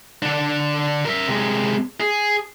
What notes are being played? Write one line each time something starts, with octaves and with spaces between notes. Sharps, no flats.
D3 D4
A#4 E5
C3 G#3
G#4